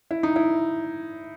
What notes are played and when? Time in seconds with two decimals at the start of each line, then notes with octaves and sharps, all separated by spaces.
0.11 E4
0.23 D#4
0.36 E4